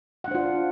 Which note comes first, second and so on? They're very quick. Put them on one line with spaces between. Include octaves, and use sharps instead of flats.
F#5 D4 C5 F4